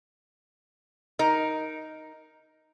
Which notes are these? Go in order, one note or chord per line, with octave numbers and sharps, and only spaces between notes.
D#4 A#4